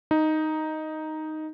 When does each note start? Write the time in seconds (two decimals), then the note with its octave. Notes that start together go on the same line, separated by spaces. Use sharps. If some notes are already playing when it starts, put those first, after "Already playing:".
0.11 D#4